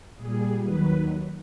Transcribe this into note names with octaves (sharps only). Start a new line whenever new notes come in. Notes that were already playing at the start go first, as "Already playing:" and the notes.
A#2 G3 G#4
D#2 D#3 F#3 B4